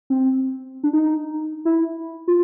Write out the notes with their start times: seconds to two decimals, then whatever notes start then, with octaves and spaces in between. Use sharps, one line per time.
0.10 C4
0.83 D4
0.93 D#4
1.65 E4
2.28 F4